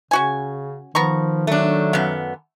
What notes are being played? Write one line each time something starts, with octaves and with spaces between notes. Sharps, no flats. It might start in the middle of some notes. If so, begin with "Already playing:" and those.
C#3 C#4 F#4 G#5
D#3 F3 B3 A#5 C#6
F#3 A3 D4
F#2 B3 F5